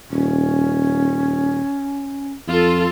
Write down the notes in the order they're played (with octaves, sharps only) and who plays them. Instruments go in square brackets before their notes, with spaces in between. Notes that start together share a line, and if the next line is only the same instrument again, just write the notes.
[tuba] D#1 [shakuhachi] C#4
[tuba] F2 [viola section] F4 A4